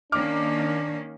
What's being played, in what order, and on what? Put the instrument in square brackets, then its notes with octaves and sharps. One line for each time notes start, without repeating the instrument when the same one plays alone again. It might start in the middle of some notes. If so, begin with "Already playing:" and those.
[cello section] D#3 A#3 C#4 [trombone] D4 [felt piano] D6 F6